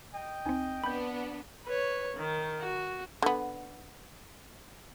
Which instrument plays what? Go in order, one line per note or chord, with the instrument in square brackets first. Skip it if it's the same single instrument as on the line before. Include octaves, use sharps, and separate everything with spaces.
[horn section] D#5 G5
[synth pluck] C#2 C4 [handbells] D#4 G#5
[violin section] B3 D4 [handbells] B5 G6
[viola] B4 C#5
D#3
F#4
[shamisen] D3 B3